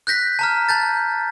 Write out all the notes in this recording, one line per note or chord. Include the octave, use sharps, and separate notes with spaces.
F#6 G6 A#6 B6
A5 A#5 F6
A5 G6 A6